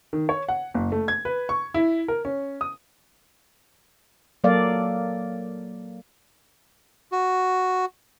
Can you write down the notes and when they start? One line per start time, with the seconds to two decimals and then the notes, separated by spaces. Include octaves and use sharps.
0.13 D#3
0.29 C#5
0.49 F#5
0.74 F#1
0.92 A3
1.08 G#6
1.25 B4
1.49 C#6
1.74 E4
2.08 A#4
2.25 C#4
2.61 D#6
4.44 F#3 A#3 A4 D5 F5
7.12 F#4